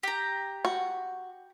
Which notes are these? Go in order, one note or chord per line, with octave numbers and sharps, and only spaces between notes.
G4 A#5
F#4